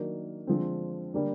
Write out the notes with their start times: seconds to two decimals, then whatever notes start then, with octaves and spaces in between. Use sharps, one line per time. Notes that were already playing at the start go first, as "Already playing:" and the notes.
Already playing: D#3 F#3 A#3 D4
0.47 D3 F3 G#3 C4
1.14 D3 G3 A#3 D4